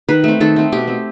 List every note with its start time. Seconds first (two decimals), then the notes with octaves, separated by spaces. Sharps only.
0.09 D#3 B4
0.24 A3 C4
0.40 D#3 A4
0.56 A3 C4
0.72 B2 G4
0.87 A3 C4